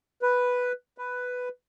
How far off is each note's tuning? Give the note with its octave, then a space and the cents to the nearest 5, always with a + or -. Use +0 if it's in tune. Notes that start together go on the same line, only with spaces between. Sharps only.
B4 +0
B4 +5